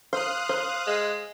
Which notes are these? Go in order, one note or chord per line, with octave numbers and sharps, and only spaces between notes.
C5 F5 D#6 F#6
C5
G#3